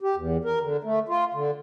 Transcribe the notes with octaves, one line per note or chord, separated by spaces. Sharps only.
G4
E2
A#4
D3
A3
F4
D3